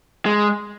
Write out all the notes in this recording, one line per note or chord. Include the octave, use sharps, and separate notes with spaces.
G#3